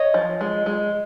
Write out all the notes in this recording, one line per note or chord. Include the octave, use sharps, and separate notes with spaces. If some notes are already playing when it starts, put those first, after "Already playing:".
Already playing: C#5 D#5
F3
G#3
G#3